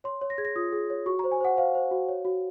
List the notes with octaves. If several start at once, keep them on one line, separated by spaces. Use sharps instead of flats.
C#5 C6
C#5
A#6
G#4 G#6
A#6
F4 D#6
G#4
C#5
F#4 C#6
A#5
C5
G#5
C5 F#5
C5 F5
C5
F#4
C#5
F#4